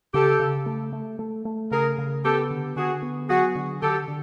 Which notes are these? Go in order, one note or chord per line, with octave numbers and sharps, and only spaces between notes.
C#3 G4 A4
C#3
A3
A3
A3
A3
C#3 G#4 A#4
C#3
B3 G4 A4
D3
D3 F#4 G#4
B3
F#3 F#4 G#4
D3
D3 G4 A4
D3